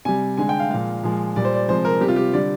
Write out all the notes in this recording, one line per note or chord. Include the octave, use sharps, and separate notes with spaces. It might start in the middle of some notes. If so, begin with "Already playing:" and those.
C3 G3 G#5
D3 G#3 G#5
G5
F5
A#2 F3 G#3 F5
A#2 F3 G#3
A#2 G3 D5
C5
D5
C3 F3 G#3 C5
A#4
C3 G3 G4
F4
G4
D3 G3 D5